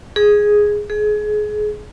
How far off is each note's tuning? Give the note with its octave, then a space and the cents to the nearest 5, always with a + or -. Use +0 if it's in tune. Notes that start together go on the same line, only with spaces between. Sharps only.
G#4 +0
G#4 +25